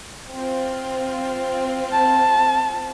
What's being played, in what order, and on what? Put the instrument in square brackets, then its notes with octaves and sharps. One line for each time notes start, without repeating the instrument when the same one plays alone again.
[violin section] C4 F4
[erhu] A5